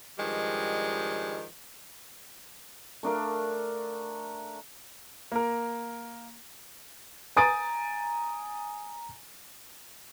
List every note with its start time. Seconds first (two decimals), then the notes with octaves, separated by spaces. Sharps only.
0.19 G2 D#3 F3 G3 G#3
3.03 A3 D4 A#4 F5
5.32 A#3 A#4
7.36 G#5 A#5 D#6 A6 D7